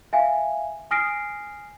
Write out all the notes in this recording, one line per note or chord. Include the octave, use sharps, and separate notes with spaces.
E5 F5 G#5
G#5 D#6 F6 A#6 C7 D7